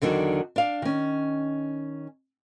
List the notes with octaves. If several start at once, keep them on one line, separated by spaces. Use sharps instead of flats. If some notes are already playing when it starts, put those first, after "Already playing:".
E2 D3 D#3 F#3 D4
D4 F5
D#3 C#4